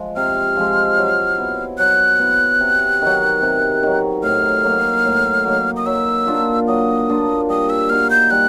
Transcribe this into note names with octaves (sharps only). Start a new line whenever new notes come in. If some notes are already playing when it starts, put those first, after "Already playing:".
Already playing: F3 G#3
C3 F6
F3 G#3
F#3
B3 E4
F#3 F#6
B3 E4
C3
D#3 F#3
C3
D#3 F#3
A2 F6
F#3 A#3 D#4
A2
F#3 A#3 D#4
D#6
F#3 E6
A#3 D4 F4
F#3 D#6
A#3 D4 F4
G3 D#6
E6
A#3 D#4 F#4 F6
G6
G3 F#6